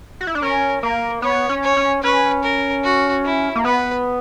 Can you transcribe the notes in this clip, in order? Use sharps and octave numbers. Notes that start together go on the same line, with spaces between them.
F#4
E4
D4
C#4 A#4
A#3 A#4
B3 C#5
C#4
C#5
C#4
C#4 B4
A#4
F#4
E4
A#3
B3 B4